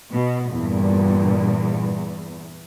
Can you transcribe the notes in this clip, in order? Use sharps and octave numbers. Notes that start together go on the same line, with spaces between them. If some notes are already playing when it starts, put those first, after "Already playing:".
B2
E2 G2 A#2